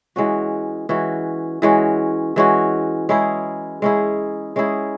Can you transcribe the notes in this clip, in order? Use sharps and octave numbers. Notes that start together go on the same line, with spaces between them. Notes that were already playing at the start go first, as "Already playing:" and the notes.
E3 G#3 C#4 F#4
E3 G#3 C#4 F#4
E3 G#3 C#4 F#4
E3 G#3 C#4 F#4
G#3 C#4 E4 G#4
G#3 C#4 E4 G#4
G#3 C#4 E4 G#4